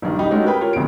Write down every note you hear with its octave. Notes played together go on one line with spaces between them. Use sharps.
A#1 G2 D#3
D#1 D#4 G4 D#5 B5
G#3 A3 C#4 D#4 F#4 G4
G4 A#4 B4 G5 B5
F4 G4 A#4 C#5
F1 D2 B2 G5 D7